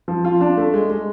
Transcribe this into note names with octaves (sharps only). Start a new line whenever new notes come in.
F3
F4
D4
A3
G#3
G#3